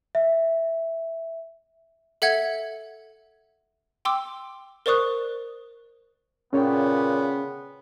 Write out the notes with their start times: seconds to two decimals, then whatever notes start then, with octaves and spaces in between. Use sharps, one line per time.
0.15 E5
2.22 A4 E5 F#5 G#6
4.05 G5 C6 D6 E6
4.86 A#4 C5 D5 C#6 D#6 F#6
6.53 A#2 C#3 B3 C#4 C#5 G5